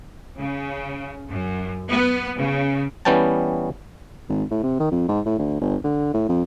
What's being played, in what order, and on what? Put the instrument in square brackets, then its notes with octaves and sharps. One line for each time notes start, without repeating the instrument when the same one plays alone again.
[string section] C#3
F#2
B3
C#3
[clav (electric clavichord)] E3 G3 B3 C#4 G5 A5
[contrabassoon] G#1
A2
C3
D#3
F2
G#2
A2
D2
G1
D3
A2
F2